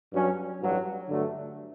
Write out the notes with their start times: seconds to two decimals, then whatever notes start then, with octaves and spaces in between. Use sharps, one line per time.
0.12 G2 F#3 C#4
0.60 A1 G2 F#3
1.08 G2 D3 F#3 A3